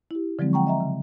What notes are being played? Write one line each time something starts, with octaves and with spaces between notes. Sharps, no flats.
E4 G4
D3 F3 F#3 G#3 C4
F#5 G5 A#5 C#6
D#5 E5 A#5
C#3